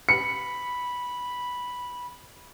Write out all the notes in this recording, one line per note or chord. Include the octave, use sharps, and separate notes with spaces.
B5 C#7